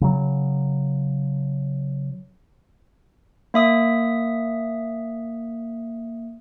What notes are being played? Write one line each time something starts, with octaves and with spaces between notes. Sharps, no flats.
C#3 F#3
A#3 E5 D#6